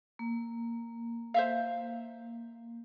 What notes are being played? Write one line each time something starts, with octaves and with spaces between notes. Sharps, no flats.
A#3
C5 E5 F5